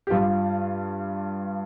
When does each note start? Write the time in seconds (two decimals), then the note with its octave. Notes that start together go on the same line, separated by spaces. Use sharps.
0.07 G4
0.10 G2 G3 F4